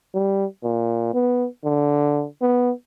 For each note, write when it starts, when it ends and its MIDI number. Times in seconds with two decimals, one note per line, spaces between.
0.14 0.45 55
0.63 1.09 46
1.14 1.47 59
1.65 2.25 50
2.41 2.72 59